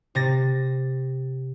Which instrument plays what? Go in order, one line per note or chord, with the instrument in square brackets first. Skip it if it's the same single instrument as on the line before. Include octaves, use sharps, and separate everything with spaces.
[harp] C3 A6 A#6